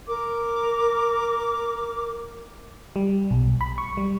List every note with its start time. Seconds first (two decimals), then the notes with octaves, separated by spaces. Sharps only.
0.08 A#4 D6
2.96 G3
3.31 B1
3.61 B5
3.78 C#6
3.97 G3